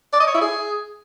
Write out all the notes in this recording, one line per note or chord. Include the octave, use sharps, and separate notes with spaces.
D5
D#5
C#5
E4
G#4